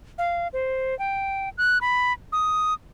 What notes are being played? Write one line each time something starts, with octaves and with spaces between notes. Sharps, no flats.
F5
C5
G5
F#6
B5
D#6